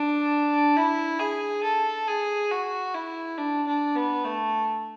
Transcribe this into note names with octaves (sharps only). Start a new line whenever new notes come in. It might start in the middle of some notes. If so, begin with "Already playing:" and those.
Already playing: D4
E4
G#4
A4
G#4
F#4
E4
D4
D4
B3
A3